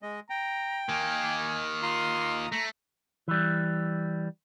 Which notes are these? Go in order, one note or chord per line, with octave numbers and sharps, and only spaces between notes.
G#3 D#5
G5 A#5
D#3 A#3 G#5
F4 A#5 C6 D#6
A3 A#5
E3 G3